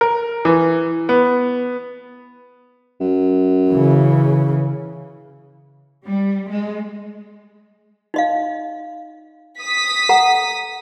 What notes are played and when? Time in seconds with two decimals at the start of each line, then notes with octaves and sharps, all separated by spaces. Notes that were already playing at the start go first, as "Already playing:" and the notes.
0.01 A#4
0.45 E3
1.09 B3
3.01 F#2
3.70 C#3 E3
6.05 G3
6.49 G#3
8.14 D#4 D#5 F5
9.61 D#6 B6
10.09 A4 F#5 A#5